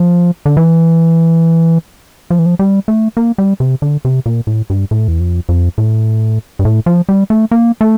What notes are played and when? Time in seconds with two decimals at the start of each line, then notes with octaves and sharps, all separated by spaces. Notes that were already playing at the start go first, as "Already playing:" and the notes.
Already playing: F3
0.46 D3
0.57 E3
2.30 F3
2.39 E3
2.46 F3
2.59 G3
2.88 A3
3.17 A#3
3.38 G3
3.60 C3
3.82 D3
4.05 C3
4.26 A#2
4.47 A2
4.70 G2
4.91 A2
5.08 E2
5.20 F2
5.49 F2
5.78 A2
6.59 G2
6.65 A2
6.86 F3
7.09 G3
7.30 A3
7.51 A#3
7.81 A3